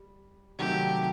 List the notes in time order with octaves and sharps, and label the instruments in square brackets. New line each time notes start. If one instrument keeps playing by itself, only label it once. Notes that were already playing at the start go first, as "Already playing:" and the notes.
Already playing: [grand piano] G3
[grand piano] C3 D#3 F#3 A3 [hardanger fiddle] G4